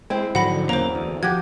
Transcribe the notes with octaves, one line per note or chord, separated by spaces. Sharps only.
G#3 C4 E4
G#2 D3 F3 F#3 F#5 B5 A#6
E2 C#3 F#3 A#3 C5 A#5
D2
F3 F#4 G4 G#6